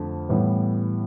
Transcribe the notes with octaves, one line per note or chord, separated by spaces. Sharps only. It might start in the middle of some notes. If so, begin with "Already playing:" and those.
Already playing: F2 D3 F3 A3
A2 E3 G3 B3